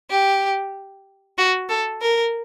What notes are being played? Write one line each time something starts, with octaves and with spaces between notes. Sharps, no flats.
G4
F#4
A4
A#4